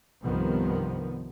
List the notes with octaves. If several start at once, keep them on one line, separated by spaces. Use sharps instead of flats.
C2 G2 C3 D#3 F3 B3